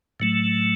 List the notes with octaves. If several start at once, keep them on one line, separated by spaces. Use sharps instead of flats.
A2 F#3 A3